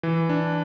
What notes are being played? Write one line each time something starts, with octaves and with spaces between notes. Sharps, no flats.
E3
D4